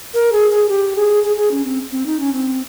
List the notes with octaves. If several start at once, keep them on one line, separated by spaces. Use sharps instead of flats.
A#4
G#4
G#4
G4
G#4
G#4
G#4
C#4
C4
C4
D#4
C#4
C4